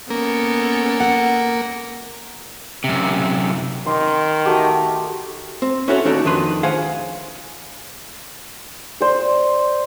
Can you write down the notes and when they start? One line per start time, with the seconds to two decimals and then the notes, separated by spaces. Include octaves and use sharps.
0.10 A#3 B3 C#4 A4
1.00 F#5
2.84 F#2 C3
3.86 D#3 C6 D6
4.46 A3 F#4 G4
5.62 C4
5.88 C#4 E4 F#4 A4 C5 C#5
6.05 D#2 C#4 D#4 F#4 A4 D5
6.25 F2 D#3 D4 B4 C6
6.63 G#4 C5 F5 F#5 G#5
9.00 C5 D5